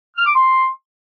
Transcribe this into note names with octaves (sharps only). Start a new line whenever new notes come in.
F6
D6
C6